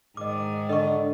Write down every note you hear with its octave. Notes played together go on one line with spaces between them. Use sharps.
G#2 D#3 G#4 D#5 D6
D3 D#5 C#6